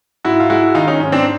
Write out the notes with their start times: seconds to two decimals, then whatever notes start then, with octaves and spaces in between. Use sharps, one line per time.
0.25 G#2 E4 F#4
0.40 F4
0.50 G#3 E4 F#4
0.75 D#3 D#4 F4
0.87 C#4 D#4
1.00 G#2 C#4
1.12 C4 D4